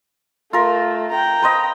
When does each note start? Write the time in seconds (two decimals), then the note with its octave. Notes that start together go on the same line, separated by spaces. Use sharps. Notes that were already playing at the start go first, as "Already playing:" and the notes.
0.53 A3 F4 A#4
1.11 G5 A#5
1.42 B4 C5 D#5